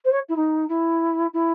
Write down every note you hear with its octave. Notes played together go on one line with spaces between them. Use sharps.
C5
C#5
E4
D#4
E4
E4